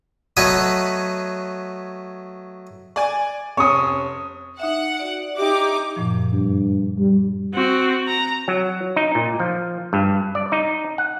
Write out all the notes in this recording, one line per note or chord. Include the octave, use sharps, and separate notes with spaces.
F#3 A3 B3 B4 C#5 D#5
D5 G#5
F1 C#4 C#6 D#6
D#4 E5 F#5
F#4 D5
D#4 G4 E5 D6
F#2 A#2 F3
G2
G3
C4 F#4
A#5
F#3
D#4
A#2
F3
G2
D5
D#4
F#5